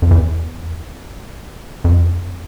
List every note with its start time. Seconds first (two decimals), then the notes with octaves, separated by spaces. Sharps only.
0.02 F2
0.11 E2
1.84 F2